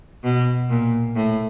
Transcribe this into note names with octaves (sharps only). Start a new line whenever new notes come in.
B2
A#2
A2